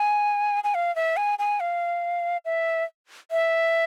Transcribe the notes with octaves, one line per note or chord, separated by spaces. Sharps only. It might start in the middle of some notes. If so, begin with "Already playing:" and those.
Already playing: G#5
G#5
F5
E5
G#5
G#5
F5
E5
E5